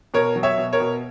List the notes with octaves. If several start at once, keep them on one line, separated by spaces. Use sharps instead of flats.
B2 A#4 C#5
F#3
C#5 E5
B2
A#4 C#5
B2